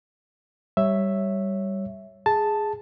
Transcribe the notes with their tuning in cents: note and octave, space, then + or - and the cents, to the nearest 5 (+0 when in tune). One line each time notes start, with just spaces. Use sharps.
G3 -5 C#5 -5 E5 +0
G#4 +0 A5 +0